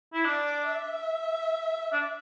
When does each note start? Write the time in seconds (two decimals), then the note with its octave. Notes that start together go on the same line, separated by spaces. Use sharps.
0.13 E4
0.25 D4 D5
0.66 E5
1.92 D4